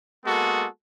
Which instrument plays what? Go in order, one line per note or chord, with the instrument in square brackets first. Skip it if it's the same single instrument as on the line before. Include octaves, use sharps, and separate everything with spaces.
[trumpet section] G#3 A#3 B3 F#4 A4